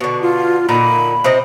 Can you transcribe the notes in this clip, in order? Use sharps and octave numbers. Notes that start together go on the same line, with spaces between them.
B2 D3 C#6
F4
A#2 D3 D#4 B5
C3 C4 D#5